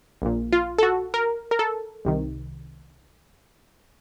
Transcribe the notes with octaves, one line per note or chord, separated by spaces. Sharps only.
A#1 A#2
F4
A4
F#4
A#4
A#4
A4
C2 C3 D#3